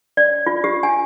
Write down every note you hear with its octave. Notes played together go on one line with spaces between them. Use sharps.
D5
F4
G4
G#5